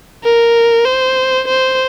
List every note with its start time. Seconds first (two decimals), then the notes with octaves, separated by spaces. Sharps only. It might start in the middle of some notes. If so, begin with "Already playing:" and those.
0.24 A#4
0.85 C5
1.48 C5